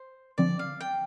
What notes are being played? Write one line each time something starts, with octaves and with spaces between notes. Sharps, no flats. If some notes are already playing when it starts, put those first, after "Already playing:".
Already playing: C5
D3 F3 C4 D5
F5
G5